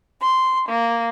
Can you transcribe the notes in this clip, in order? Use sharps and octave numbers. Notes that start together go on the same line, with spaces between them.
C6
A#3